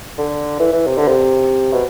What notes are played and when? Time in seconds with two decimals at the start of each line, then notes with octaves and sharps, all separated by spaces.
0.18 D3
0.59 E3
0.73 E3
0.87 C3
0.98 D3
1.08 C3
1.73 B2